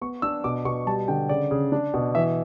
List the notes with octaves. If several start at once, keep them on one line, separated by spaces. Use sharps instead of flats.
B3 C#6
D4 E6
B2 D6
B2 C#6
G3 A5
D3 G5
C#3 D5
C#3
D4
B2
E3 E5